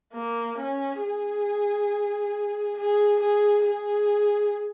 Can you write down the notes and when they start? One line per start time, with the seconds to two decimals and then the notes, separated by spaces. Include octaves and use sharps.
0.13 A#3
0.58 C#4
1.01 G#4
2.77 G#4
3.20 G#4
3.65 G#4